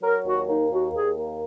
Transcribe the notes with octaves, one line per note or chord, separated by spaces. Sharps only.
F#3 A#4
D#2 F#4
A#3 D#4
D#2 F#4
D#2 G#4
A#3